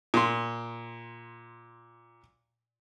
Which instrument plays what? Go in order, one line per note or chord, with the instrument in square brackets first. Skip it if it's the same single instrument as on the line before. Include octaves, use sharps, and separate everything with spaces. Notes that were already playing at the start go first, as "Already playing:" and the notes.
[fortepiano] A#2 C6